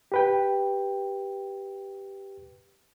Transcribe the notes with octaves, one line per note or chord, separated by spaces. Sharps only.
G4 B4 G5